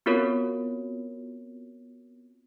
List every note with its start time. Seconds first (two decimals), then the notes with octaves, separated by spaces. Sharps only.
0.06 B3 C4 F4 F#4 A#4 C#5